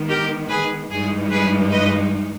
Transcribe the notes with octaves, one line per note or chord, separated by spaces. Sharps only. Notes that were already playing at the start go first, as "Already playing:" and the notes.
Already playing: D#3 G#3 B3
G4 A#4
G#4 B4
G2 E3 G#3 D#4 G#4
G#4 B4
B4 D#5